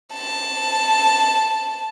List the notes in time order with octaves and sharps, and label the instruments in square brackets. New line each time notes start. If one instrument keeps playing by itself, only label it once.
[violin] A5